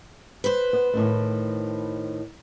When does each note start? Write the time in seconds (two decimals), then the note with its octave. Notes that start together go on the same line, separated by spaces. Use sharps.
0.44 B4 C5
0.73 B3
0.94 A2 D#3 A3